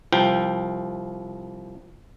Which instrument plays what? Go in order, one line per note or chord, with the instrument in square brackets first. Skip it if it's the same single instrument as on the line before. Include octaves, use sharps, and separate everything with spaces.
[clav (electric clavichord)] C2 F3 G5